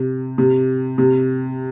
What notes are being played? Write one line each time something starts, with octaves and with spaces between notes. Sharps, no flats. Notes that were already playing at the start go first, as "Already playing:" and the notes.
Already playing: C3
C3
C3